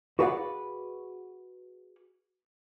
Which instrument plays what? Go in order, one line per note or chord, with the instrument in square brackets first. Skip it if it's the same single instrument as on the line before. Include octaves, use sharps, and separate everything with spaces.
[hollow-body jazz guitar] F#4 G#4 B4 D5 F5 F#5